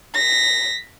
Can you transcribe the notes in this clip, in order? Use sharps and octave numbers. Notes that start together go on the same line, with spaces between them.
A#6 B6